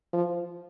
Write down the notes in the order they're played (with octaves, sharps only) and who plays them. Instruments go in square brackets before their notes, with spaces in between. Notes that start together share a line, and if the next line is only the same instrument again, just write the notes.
[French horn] F3